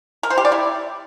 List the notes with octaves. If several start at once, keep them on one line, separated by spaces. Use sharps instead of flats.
A#4
C5
G4
D5
E4